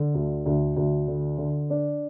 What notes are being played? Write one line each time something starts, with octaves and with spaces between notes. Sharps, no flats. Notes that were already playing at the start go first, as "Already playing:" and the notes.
Already playing: D3
D2
D2
D2
D3
D3
D4